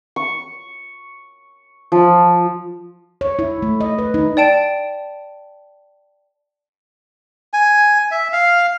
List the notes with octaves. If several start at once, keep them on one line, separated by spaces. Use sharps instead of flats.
C#6
F3
C#5
E4
A3
D#5
B4
D#4
D5 G5 A5 D7
G#5
E5
F5